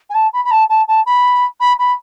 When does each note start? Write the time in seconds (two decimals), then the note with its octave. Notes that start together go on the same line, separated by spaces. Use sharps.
0.09 G#5
0.14 A5
0.33 B5
0.44 B5
0.51 A5
0.69 A5
0.87 A5
1.06 B5
1.60 B5
1.79 B5